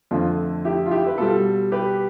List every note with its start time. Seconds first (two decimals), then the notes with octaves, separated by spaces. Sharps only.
0.11 F2 D3 A3 F4
0.65 E4 G4
0.86 F4
0.91 E4 G4
1.07 B4
1.18 B2 G3 F4 A4
1.72 G4 B4